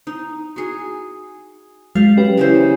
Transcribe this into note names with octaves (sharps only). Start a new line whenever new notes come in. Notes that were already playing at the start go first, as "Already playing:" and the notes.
D#4
F#4 G#4
F#3 G#3 F5
C#4 G4 B4
C#3 E3 C5